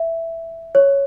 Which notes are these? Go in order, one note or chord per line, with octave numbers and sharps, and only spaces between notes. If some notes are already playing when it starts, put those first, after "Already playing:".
Already playing: E5
C#5